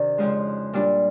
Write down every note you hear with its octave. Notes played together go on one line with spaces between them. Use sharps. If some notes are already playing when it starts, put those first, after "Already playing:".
Already playing: C3 D#3 D4
F2 C#3 F3 G#3
A#2 G3 A#3 D4 F4